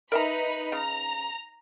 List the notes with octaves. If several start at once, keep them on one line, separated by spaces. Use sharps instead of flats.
D#4 A#4 B4 E5 A#5 B5
C#3 A#5